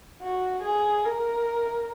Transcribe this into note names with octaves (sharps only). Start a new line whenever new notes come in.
F#4
G#4
A#4